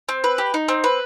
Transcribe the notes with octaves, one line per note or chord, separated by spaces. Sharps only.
C4
B4
G4
D#4
C4
B4